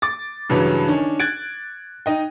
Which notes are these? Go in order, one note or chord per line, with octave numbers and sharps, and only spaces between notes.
D6 A6
G2 C#3 E3 F#3
D#3 C#4 D4
F#6 G#6 A6 D7
D#4 D#5 G5